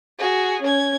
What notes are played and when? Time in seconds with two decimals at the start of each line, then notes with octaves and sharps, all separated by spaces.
0.19 F#4 G#4
0.63 C#4 G#6